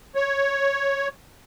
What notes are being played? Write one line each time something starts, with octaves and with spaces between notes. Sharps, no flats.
C#5